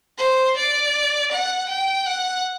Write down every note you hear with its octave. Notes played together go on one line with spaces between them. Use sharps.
C5
D5
F#5
G5
F#5